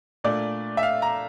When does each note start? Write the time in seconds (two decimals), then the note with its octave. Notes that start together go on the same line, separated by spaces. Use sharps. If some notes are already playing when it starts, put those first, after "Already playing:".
0.24 A#2 A3 D4 D5
0.77 E5
0.83 F5
1.02 A#5